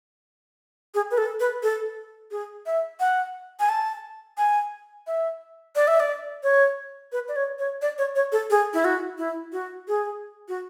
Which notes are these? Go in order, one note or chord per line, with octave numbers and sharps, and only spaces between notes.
G#4
B4
A4
B4
A4
G#4
E5
F#5
G#5
A5
G#5
E5
D5
E5
D5
C#5
B4
D5
C#5
C#5
D5
C#5
C#5
A4
G#4
E4
F#4
E4
F#4
G#4
F#4